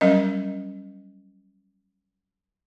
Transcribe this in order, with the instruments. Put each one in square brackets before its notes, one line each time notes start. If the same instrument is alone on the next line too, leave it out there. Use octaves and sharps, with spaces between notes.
[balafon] F#3 G3 C#4 A#4 D#5